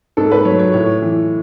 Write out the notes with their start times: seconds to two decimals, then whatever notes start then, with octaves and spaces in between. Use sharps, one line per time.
0.17 G#2 A4
0.32 B4
0.45 F#3 C#5
0.59 C#5
0.73 A2 C#5
1.02 E3